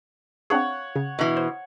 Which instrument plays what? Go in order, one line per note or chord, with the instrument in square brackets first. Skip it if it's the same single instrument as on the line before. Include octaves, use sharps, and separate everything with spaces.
[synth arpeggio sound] C4 D4 G#4 [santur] C#5 F#5
[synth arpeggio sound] C#3
[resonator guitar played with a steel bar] B2 E3
[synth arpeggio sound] C5